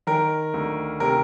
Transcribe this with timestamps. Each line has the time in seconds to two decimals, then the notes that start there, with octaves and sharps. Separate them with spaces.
0.07 D#3 A#4
0.54 D2
1.00 C3 A#4